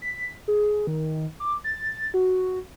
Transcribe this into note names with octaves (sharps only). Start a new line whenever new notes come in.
B6
G#4
D#3
D6
A6
F#4